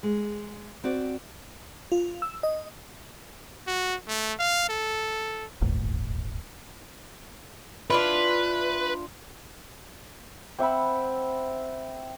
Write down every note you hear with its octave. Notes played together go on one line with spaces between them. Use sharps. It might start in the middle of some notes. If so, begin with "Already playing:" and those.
G#3
C4 F#4 D5
F4
E6
D#5
F#4
A3
F5
A4
D1 G1 D#2 A2
D4 E4 F4 B4
C4 E5 F#5 B5